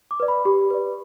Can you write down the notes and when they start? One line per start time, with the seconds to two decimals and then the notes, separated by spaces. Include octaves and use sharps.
0.11 D6
0.20 B4 D5
0.28 B5
0.45 G4
0.70 B4 D5